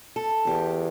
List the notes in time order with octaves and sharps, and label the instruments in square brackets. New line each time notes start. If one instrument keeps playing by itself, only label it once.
[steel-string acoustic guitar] A4
[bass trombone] E2 [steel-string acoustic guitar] G4